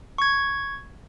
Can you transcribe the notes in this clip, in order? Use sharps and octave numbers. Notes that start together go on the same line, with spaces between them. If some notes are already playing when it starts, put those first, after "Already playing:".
C#6 G#6